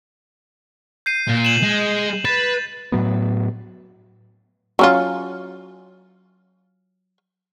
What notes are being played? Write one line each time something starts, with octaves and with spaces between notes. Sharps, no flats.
G6 C7 D#7
A#2
E7 F#7
G#3
B4 A6 E7
A2 F#3 B3
F#3 C#4 F4